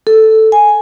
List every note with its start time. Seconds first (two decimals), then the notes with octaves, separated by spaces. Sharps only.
0.07 A4
0.52 G#5